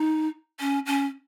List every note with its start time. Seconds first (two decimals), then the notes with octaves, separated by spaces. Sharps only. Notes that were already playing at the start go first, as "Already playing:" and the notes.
Already playing: D#4
0.60 C#4
0.86 C#4